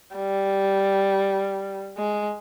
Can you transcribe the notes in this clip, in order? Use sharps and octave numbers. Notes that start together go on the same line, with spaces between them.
G3
G#3